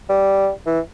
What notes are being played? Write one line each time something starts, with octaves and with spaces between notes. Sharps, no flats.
G3
E3